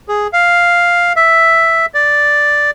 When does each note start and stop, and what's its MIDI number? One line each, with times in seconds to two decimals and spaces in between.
0.09 0.27 68
0.33 1.13 77
1.16 1.86 76
1.94 2.71 74